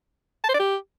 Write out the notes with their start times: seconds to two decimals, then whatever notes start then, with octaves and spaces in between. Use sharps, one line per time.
0.44 A5
0.49 C5
0.54 D5
0.60 G4